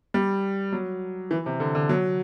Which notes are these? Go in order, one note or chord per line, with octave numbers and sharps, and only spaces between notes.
G3
F#3
E3
C3
D3
D3
F#3